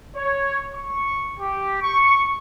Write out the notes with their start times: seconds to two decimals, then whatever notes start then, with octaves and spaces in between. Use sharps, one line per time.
0.15 C#5
0.75 C#6
1.39 G4
1.82 C#6